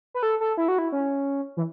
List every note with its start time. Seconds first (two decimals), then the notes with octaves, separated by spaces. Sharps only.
0.14 B4
0.23 A4
0.40 A4
0.57 E4
0.68 F#4
0.78 E4
0.92 C#4
1.57 E3